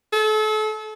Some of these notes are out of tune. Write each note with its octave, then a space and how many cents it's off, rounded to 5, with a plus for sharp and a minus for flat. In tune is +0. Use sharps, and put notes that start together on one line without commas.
A4 -35